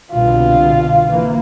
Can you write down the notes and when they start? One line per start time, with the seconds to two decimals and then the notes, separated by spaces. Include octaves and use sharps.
0.12 C2 B2 D3 F4
1.09 E3 A#3